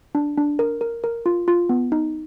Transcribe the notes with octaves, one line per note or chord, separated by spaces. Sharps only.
D4
D4
A#4
A#4
A#4
F4
F4
B3
D#4